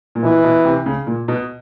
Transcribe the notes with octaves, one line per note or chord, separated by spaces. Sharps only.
A#2
B2 E3
B2
C3
C#3
A#2
B2